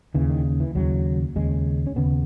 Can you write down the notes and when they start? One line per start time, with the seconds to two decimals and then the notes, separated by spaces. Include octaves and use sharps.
0.15 D#2 C#3 E3
0.30 D#3
0.60 E3
0.75 D#2 C#3 F#3
1.36 D#2 C#3 G#3
1.87 C#4
1.96 D#2 C#3 B3